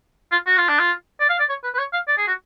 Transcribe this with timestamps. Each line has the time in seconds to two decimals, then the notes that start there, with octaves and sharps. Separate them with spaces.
0.32 F4
0.46 F#4
0.57 F4
0.69 D4
0.79 F4
1.20 D5
1.29 F5
1.39 D5
1.49 C#5
1.64 B4
1.74 B4
1.79 C#5
1.93 F5
2.08 D5
2.18 G#4
2.27 F#4